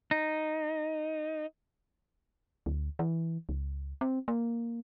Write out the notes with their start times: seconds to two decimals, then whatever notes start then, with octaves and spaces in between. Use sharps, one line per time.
0.11 D#4
2.66 D2
2.99 E3
3.49 C#2
4.01 C4
4.28 A#3